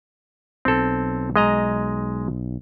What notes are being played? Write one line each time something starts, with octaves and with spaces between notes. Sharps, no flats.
B1 C4 A4
G#3 D#5 A#5